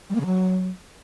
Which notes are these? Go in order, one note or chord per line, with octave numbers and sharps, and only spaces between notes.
G3
A#3
C#3
F#3